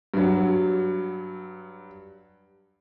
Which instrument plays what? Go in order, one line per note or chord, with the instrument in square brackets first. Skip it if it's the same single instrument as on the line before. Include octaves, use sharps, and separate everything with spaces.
[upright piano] G2 F#3